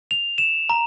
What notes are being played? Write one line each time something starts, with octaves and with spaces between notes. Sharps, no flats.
F7
E7
A#5